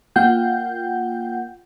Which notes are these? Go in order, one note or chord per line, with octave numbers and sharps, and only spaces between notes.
A#3 F4 F#5 G5 G6